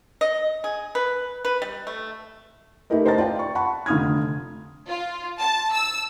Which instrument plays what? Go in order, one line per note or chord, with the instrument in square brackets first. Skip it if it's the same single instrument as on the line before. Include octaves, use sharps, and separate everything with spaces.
[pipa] D#5
G#4
B4
B4
G3
A3
[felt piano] A3 D#4 E4 G4 A#4 D#5
C5 D#5 A5 A#5 A6
F4 D5 G5
C#6
F#5 A5 B5 C#6
F1 D3 F4 D#6 F6 G#6
[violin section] F4
A5
E6